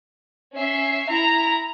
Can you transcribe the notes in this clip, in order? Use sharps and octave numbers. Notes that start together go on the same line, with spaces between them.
C#4 E5 C7
E4 A#5